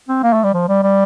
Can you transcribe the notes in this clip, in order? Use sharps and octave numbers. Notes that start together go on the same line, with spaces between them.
C4
A#3
A3
G3
F3
G3
G3